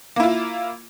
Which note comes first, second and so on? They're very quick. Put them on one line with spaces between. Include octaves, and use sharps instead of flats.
A#3 E4 F4